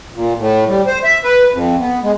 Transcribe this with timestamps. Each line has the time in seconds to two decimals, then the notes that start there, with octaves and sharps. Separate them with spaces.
0.15 A#2
0.39 A2
0.68 G3
0.86 C5
1.04 E5
1.24 B4
1.53 F2
1.80 B3
2.03 G#3